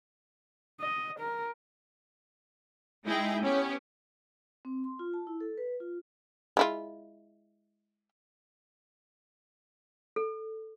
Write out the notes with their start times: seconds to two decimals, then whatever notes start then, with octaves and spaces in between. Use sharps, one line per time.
0.80 D#5
1.20 A#4
3.05 G#3 D#4 E4 G#4 G5
3.41 B3 C#4 G4
4.65 C4
4.84 C6
4.99 F4
5.14 A5
5.27 E4
5.41 A4
5.58 B4
5.80 F4
6.57 G#3 E4 F4
10.16 A4